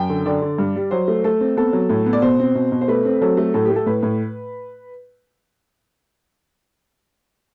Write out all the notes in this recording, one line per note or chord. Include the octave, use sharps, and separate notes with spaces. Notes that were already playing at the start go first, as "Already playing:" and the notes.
Already playing: F#2 G5
D3
D3 D5
D3
G2
G3
F#3 C5
A3
A3 A4
C4
B3 A4
F#3
A2
B3
D5
B2 C5
C4
B2
B2
C5
A3 B4
C4
F#3 A4
A3
A2 A4
A3 G4
A4
A2 B4
A2